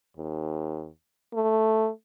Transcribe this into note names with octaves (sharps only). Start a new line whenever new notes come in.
D#2
A3